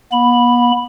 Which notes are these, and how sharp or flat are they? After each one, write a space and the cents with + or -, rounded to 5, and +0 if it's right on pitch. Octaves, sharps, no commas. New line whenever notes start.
B3 -40 B5 +0